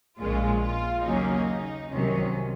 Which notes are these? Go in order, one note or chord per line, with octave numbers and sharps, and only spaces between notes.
A#1 A#2 G#3 C#4 F4
F4
D#2 C#3 F#3 A#3 C#4 D#4
C2 C3 D#3 F#3 C#4